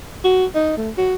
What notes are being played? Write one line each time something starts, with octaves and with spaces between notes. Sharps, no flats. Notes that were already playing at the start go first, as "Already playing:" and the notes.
F#4
D#4
A3
F#4